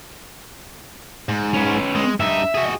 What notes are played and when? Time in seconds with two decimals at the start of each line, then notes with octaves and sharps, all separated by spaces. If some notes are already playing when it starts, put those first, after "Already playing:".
1.29 G#2
1.54 C#4 B4
1.95 G#3
2.20 G2 D#4 E5
2.55 F#4 G#4